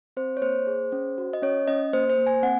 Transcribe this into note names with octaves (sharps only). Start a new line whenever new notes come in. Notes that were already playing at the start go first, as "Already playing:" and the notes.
C4 C5
C#5
A#3 C5
G#4
C#4
F#4
D#5
C#4 C#5
C#4 D#5
A#3 C5
C5
A#3
G#5
C4 F#5